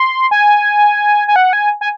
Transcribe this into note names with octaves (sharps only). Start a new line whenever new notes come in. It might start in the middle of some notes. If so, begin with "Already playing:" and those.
Already playing: C6
G#5
G#5
F#5
G#5
G#5